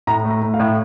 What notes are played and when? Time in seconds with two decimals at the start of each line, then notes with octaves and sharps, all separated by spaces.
0.07 A2 A#5
0.24 A3
0.31 A#5
0.42 A3
0.54 F5
0.60 A2